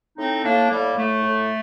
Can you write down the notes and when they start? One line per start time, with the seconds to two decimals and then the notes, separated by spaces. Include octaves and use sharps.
0.18 A2 C4 D#4
0.44 A2 A#3 D4
0.70 A2 G3 A#3
0.96 A2 A3
1.23 A2